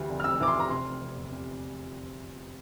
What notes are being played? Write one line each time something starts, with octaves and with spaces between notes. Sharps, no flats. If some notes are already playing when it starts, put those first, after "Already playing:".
Already playing: D2 E3 G3
F1
F6
F2 E6
E3 D6
C6
G3 A#5
C3 C6
F1
F1
E2
C3